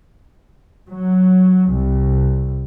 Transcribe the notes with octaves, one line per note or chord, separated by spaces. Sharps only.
F#3
C2